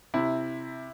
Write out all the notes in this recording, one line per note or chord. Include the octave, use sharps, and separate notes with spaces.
C3 E4